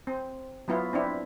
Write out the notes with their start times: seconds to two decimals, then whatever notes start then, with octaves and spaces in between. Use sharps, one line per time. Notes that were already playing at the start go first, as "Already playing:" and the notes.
0.07 C4
0.68 F#3 B3 E4 F4
0.93 C4 D4 E4